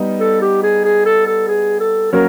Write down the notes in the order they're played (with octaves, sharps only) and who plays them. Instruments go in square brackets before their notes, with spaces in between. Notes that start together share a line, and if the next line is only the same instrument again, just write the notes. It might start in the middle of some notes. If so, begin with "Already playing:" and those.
Already playing: [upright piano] G3 B3 D#4
[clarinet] A4
G4
G#4
G#4
A4
A4
G#4
A4
[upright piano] F#3 A#3 C#4 [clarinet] A#4